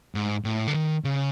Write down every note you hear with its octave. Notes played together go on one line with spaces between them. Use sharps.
G#2
A2
D3
D#3
C#3